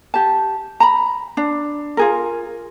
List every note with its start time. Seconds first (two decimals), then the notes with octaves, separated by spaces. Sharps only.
0.14 G4 A5
0.80 A#5 B5
1.37 D4
1.97 F4 G#4 A#4